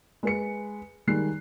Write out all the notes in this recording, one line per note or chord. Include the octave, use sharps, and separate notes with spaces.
G#3 B4 C#7
D#3 G3 G#3 F#6 C7